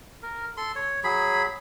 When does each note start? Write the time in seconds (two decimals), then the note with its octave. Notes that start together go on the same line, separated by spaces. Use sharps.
0.22 A#4
0.57 A4 C6
0.76 C#5
1.04 F#3 G#4 B5